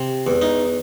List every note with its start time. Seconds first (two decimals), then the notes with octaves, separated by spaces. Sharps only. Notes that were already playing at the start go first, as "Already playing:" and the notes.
Already playing: C3
0.27 E2
0.42 D#4